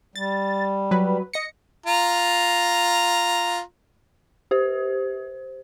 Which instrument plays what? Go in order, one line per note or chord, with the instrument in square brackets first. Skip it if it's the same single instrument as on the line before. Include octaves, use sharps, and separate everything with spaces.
[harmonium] G3 [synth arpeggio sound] A6
[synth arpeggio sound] F#3 B4
D#5 A#6 C#7
[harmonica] F4 A#5
[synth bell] G4 C5